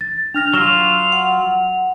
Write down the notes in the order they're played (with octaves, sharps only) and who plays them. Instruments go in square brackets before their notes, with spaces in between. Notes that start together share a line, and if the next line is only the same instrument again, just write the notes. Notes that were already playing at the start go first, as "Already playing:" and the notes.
[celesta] A6
[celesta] D4 F6 A#6 [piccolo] F7
[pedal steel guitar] F#3 F4 [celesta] F6 E7 G7
[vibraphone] F#5